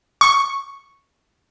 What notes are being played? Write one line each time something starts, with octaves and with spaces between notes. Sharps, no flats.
C#6